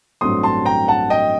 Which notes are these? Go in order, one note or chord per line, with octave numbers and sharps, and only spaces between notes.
A1 G2 F#3 A3 C4 C6 D#6
A5 C6
G5 A#5
F#5 A5
D#5 G5